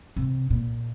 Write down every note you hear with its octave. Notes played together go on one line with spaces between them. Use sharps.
C3
A#2